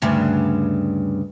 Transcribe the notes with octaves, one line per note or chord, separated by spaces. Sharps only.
D2 G2 C#3